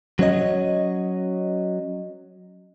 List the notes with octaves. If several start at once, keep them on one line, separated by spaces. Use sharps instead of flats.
F#3 C#4 C#5 D#5